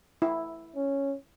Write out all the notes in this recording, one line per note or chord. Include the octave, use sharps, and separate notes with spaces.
E4
C#4